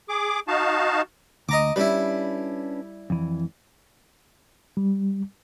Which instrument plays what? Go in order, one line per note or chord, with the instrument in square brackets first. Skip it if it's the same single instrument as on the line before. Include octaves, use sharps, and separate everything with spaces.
[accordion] G#4 D6
D#4 F#4 F5 A5
[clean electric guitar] D2 [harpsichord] D#5 A#5 D6
[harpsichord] G3 E4 [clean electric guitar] C#4 D4 B4
[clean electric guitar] F2 E3
[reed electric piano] G3